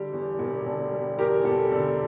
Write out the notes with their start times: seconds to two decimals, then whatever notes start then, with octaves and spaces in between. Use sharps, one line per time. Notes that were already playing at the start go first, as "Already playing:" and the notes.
Already playing: D3 G3 G4
0.13 E2
0.39 E1
0.66 D3
0.92 G3
1.18 E2 G4 A#4
1.44 E1 A4
1.72 D3